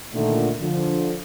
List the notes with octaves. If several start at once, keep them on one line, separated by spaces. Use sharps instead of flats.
A#2 D3 D#3 A3
D3 F3